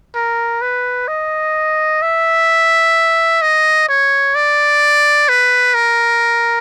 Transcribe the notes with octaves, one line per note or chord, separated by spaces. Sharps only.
A#4
B4
D#5
E5
D#5
C#5
D5
B4
A#4